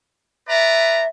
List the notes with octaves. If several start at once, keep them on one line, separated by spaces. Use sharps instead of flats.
B4 D5 E5 A#5